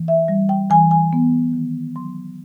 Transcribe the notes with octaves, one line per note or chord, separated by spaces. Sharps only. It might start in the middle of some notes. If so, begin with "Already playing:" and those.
Already playing: E3 A#3
E5
G3
G5
E3 G#5
G#5
B3
D#3
F#3 C6